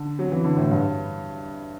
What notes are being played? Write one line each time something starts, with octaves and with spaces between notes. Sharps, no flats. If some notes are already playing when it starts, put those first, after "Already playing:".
Already playing: D3
F#3
E3
D3
A2
G2